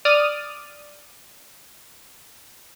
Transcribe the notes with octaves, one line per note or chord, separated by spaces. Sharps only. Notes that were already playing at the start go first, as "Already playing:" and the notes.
D5 D#6 F6 D#7